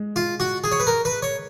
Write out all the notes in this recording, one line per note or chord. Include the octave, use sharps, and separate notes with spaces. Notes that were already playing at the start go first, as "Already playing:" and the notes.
Already playing: G#3
F4
F#4
G#4
C#5
B4
A#4
B4
C#5